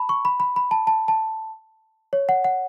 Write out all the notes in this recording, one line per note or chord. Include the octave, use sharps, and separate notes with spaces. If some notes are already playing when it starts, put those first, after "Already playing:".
Already playing: A5 B5
C#6
B5
B5
B5
A5
A5
A5
C#5
F#5
F#5